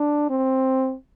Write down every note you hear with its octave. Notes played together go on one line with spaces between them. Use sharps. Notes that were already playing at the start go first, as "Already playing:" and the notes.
Already playing: D4
C4